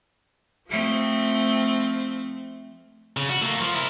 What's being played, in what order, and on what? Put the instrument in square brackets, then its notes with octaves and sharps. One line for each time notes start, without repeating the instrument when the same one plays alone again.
[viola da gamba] F3 A3 C4
[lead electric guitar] C#3
F#4
A3 A#3
F3
E4 A#4